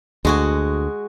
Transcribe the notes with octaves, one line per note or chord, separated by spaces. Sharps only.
D2 G#3 F#4 G#4